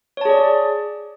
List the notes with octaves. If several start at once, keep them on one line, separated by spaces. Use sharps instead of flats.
G#4 C#5 D5 A5